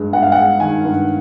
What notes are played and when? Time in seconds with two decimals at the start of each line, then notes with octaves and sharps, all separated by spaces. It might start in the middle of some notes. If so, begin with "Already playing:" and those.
Already playing: G2 G#3
0.13 G2 F#5
0.22 F5
0.32 F#5
0.37 G#3
0.60 D#3 G#5
0.84 G2